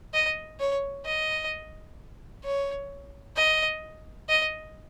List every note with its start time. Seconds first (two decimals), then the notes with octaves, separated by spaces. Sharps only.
0.14 D#5
0.60 C#5
1.05 D#5
2.44 C#5
3.37 D#5
4.29 D#5